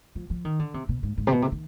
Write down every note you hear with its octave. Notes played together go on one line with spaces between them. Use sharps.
F3
F3
D#3
D3
C3
B2
G#2
G#2
C3
B2
C3
D#3